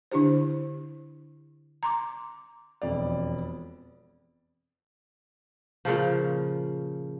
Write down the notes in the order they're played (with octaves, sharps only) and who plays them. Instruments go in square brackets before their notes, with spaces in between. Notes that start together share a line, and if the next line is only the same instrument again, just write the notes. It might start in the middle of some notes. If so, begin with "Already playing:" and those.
[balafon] D3 D4 E4 G4 C5
A#5 C6 D6
[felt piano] E1 F2 D5
[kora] A#2 C#3 F3